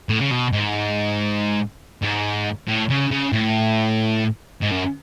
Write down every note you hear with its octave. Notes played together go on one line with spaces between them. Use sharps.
A2
C#3
B2
G#2
G#2
A2
C#3
C#3
A2
G#2
F#2